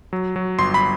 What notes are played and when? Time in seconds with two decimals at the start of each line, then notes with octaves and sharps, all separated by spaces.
0.13 F#3
0.36 F#3
0.59 G1 C6
0.74 B5